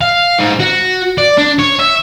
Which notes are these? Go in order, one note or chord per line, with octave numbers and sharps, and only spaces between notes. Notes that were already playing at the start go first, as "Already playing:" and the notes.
F5
G#2
F#4
D5
D4
C#5
E5